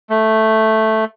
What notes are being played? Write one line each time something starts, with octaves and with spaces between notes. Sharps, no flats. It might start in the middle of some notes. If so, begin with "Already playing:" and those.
A3